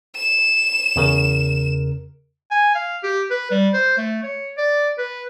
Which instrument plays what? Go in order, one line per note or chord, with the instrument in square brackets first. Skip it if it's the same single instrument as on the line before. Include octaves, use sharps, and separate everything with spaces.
[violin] E7
[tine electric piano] E2 C#3 A#4
[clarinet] G#5
F5
G4
B4
G3
C5
A3
C#5
D5
B4